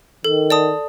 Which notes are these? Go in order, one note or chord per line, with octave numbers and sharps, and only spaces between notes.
D#3 A4
D5 A5 D#6